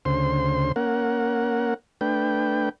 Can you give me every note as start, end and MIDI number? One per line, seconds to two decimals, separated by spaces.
0.05 0.72 38
0.05 0.72 49
0.05 0.72 72
0.05 0.72 84
0.76 1.74 58
0.76 1.74 61
0.76 1.74 70
0.76 1.74 78
2.01 2.69 57
2.01 2.69 62
2.01 2.69 71
2.01 2.69 79